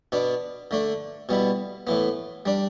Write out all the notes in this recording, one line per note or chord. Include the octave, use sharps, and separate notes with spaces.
B2 B3 D4
D3 A3 D4
B2 G3 B3 E4
A2 E3 B3
G3 D4